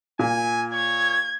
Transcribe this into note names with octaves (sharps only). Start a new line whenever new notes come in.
A#2 G#5
C#5 G#6